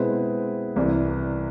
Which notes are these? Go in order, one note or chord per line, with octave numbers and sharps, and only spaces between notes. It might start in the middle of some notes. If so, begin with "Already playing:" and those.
Already playing: B2 G#3 C4 E4 B4
C2 C3 E3